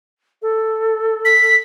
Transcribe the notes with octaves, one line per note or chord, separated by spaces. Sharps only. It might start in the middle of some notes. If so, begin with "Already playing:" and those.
A4
B6